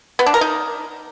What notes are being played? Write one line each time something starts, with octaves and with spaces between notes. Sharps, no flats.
B3
D4
A#4
D#4